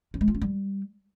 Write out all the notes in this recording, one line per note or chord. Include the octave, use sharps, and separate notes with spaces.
C#4
G#3
F4
C#4
G3